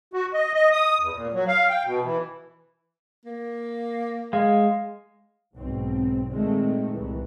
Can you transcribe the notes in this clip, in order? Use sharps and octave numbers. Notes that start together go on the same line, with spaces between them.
F#4
D#5
D#5
D#6
E2
A#2
F#3
F5
G5
B2
E3
A#3
G#3 F5
B1 G#2 C4
A#2 D#3 G#3 A3 C4
C2 E3